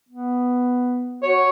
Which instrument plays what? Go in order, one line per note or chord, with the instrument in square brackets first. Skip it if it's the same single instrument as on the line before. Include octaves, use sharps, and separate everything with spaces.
[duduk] B3
[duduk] F#4 [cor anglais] C#5